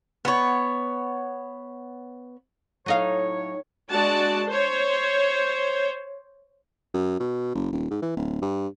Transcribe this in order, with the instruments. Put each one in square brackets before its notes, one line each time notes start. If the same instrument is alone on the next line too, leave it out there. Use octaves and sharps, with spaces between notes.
[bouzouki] B3 C#5
[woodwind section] A2 C#5 [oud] F#3 D#4 F5
[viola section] G#3 D4 F#4 D5 A5
C5 C#5
[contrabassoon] F#2
B2
F#1
D#1
G#2
E3
D1
G2